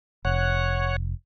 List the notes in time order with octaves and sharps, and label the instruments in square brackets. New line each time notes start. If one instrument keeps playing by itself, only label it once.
[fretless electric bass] F1 [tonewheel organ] C#5 F#5